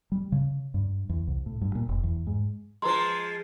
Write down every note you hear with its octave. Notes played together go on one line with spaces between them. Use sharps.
G3
C#3
G2
E2
C2
A2
G2
A#2
F1
E2
G#2
F3 G#3 B4 A#5 C6